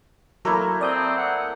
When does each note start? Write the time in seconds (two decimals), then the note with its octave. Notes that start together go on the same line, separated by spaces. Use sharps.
0.45 F#3 A3 A#3 E4 A4 A#5
0.81 C4 D5 D#6 G6
1.17 F#5